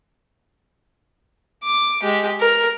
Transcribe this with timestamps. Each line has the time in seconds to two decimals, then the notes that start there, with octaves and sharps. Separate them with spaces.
1.64 D6
2.03 G#3 G4
2.40 A#4